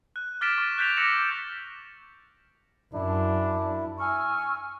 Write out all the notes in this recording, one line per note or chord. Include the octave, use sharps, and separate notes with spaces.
F#6
D6 F6 A6 B6 D7 E7
C#6
F#6 G6 A6 B6 D7 F7
D6 E6 A#6 C#7 E7 F#7
F#2 D4 E4
G#5 C#6 E6 F6